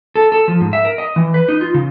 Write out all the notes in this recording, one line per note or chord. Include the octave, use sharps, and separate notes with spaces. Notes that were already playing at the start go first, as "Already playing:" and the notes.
A4
A4
F3
G#2
E5
A#4
D#5
E3
B4
D#4
F4
C#3